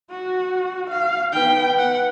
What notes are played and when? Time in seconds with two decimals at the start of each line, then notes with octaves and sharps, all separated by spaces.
0.11 F#4
0.90 F5
1.33 B3 D#4 B4 G5
1.78 F#5